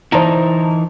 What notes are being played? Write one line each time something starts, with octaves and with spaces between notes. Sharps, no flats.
E3 D#4 E4 C5 A5 A#5